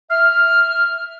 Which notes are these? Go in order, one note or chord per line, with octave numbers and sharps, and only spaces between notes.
E5 F6